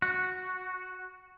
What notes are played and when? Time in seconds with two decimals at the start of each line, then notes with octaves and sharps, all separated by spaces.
0.02 F#4